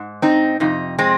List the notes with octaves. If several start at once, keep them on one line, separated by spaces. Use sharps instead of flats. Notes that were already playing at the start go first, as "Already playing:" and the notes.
Already playing: G#2
C4 D#4
F2 C3 D#4
G#3 C4